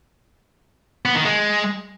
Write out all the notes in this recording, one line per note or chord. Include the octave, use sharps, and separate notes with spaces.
B3
D#3
G#3